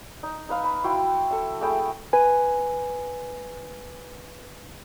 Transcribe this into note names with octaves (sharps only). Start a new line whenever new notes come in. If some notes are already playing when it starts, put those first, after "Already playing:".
D#4
D#4 B4 F5 E6
B5
E4 F#4 G5 C6
A4 E5
A3 G#4 G5 B5
B4 G#5